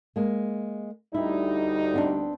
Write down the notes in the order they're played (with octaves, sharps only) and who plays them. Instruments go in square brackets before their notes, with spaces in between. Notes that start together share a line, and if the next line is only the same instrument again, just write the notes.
[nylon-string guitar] G#3 A#3
[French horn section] D2 G3 D#4 [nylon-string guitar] E4
[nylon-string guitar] B3 C4 D4